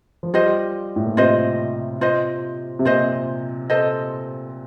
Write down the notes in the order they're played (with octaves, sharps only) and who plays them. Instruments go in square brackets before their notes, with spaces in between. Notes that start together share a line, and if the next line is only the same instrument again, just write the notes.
[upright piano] F3
[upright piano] G3 [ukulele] F4 C5 D#5
[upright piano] A2
A#2
[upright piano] C3 [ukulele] F4 C5 D#5
[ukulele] F4 C5 D#5
[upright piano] C3
[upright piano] A#2 [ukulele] F4 C5 D#5
[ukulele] A4 C5 D#5